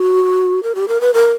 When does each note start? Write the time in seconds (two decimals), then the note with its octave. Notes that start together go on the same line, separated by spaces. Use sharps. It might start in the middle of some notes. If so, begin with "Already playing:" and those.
Already playing: F#4
0.63 A#4
0.75 G4
0.88 A#4
1.01 B4
1.14 A#4